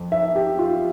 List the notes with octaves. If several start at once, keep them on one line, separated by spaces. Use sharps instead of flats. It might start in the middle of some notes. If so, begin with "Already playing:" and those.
Already playing: F2
E5
G4
F4